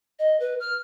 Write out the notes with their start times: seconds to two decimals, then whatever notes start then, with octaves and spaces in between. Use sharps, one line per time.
0.19 D#5
0.40 B4
0.60 F6